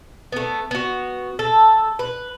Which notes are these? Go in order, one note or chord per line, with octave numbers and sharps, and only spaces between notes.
A3 B3
B3 F#4
A4
B4